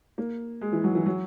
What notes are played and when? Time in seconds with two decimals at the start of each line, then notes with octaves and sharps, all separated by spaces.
0.18 A#3
0.61 G#3
0.73 E3
0.84 F#3
0.95 E3
1.06 F#3